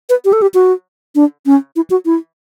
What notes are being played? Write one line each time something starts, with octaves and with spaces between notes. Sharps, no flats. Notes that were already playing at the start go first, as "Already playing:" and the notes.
B4
G4
A4
G4
F#4
D4
C#4
E4
F#4
E4